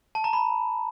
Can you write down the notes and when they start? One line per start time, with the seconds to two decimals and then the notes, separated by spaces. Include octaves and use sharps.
0.15 A5
0.24 A#5
0.33 B5